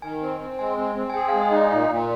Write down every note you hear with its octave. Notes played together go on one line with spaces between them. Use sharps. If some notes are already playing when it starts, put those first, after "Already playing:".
D#3 G#5
C4
C4
G#3 G#5
C4
C4
G#5
G#4 G5
G#3 F5
D#5
D#4
D5
A#2 F5
A#2